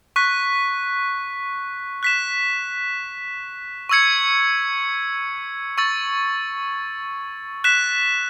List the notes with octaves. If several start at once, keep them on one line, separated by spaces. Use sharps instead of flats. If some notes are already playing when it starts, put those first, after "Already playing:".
C#6 F#6 B6
F#6 B6 E7
C#6 E6 G#6 C#7
C#6 E6 A6
F#6 B6 E7